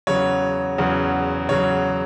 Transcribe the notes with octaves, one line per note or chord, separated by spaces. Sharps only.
E2 C#3 F#3 C#5
E2 C#3 F#3
E2 C#3 F#3 C#5